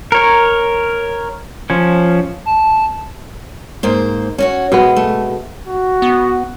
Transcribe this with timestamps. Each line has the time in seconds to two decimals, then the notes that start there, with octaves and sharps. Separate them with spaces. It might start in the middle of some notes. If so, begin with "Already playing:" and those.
0.12 A#4 C#5
1.70 F3 C#4
2.46 A5
3.83 G#2 A#3 C5
4.38 C#4 F#4 C#5
4.72 B2 G#3 B3 B4
4.96 A3
5.67 F#4
6.02 B3